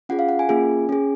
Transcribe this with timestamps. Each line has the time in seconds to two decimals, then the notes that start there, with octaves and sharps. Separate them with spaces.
0.09 C#4 F4 G#4 F#5
0.19 F5
0.29 F#5
0.39 G#5
0.49 A#3 C#4 F4 G#4
0.89 C#4 G#4